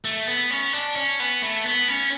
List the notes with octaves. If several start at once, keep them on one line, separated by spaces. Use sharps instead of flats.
A3
B3
C#4
D4
C#4
B3
A3
B3
C#4